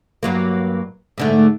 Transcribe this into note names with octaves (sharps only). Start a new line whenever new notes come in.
G2 F#3 A#3
G#2 D3 A3